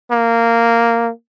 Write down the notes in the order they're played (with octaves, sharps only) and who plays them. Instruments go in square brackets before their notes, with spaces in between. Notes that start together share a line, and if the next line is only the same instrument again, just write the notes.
[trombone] A#3